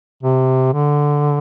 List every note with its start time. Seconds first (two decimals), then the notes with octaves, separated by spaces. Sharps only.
0.23 C3
0.73 D3